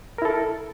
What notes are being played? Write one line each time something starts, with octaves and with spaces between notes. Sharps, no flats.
E4 A4 A#4